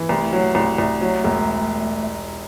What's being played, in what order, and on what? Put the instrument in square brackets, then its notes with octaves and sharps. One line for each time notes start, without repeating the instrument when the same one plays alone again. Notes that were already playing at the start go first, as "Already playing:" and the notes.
Already playing: [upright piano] E3
[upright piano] C2 [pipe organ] A3
[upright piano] F#3
C2
C2
F#3
E1